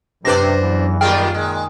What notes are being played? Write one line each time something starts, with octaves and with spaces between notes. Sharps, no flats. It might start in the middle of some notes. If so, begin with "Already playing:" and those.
F#2 C3 D4 B4 C5 D5 A#6
E2 G2 E3
A#2 D#3 G3 F4 G#4 G5 F6
A#2 D#3 G#3